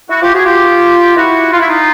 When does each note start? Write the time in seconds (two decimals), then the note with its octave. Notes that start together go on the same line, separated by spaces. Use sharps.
0.09 E4 F#4
0.22 F4 G4
0.34 F#4 G#4
0.45 F4 G4
1.16 E4 F#4
1.52 F4
1.60 E4
1.68 D#4 F4